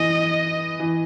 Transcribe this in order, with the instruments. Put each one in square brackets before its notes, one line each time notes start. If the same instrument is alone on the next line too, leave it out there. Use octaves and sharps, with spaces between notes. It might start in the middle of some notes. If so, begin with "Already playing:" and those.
Already playing: [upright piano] E3 [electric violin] D#5
[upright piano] E3